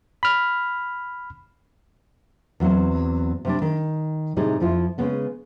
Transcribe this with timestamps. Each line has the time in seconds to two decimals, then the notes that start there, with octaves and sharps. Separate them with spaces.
0.23 B5 F6
2.60 E2 F#3 C4 F#5
3.45 C3 G3 D4
3.62 D#3
4.36 A2 C3 G3 D#4 G#4 D#5
4.60 F2 F3 E4 F4
4.98 C#3 G#3 B3 C#4